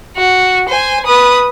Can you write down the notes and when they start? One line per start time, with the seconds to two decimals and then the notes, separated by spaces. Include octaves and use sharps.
0.17 F#4
0.69 C5 G#5
1.06 B4 D#6